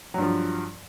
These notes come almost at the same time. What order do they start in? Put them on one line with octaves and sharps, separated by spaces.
F#3 G2 F3